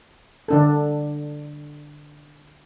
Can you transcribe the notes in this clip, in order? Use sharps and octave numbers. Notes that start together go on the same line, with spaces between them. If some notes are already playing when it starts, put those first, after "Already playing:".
D3 D4 A4